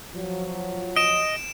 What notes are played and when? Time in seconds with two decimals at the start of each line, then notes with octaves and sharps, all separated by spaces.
0.15 F3 F#3
0.96 D#5 D7 E7